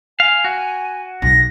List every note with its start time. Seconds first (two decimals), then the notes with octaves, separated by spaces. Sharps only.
0.20 F5 G#5
0.44 F#4
1.22 B1 A#6